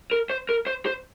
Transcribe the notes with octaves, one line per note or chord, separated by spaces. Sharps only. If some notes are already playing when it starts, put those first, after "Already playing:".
A#4
C5
A#4
C5
C5